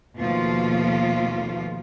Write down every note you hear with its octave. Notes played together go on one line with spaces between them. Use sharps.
D#2 B2 F3 A3 F4